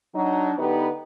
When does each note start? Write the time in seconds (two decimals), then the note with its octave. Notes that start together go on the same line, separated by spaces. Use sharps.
0.15 F#3 D4 D#4
0.59 D3 B3 D#4 G4 B4